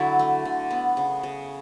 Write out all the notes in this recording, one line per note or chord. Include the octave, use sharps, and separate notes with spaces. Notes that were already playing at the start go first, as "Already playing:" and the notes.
Already playing: D3 F#3 E4 F#4 C#5
A3
D3
B3
C#3
C#3